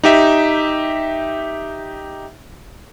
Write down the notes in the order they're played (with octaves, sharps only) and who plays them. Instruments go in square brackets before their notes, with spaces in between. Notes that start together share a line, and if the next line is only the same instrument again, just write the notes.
[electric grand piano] D#4 G4 E5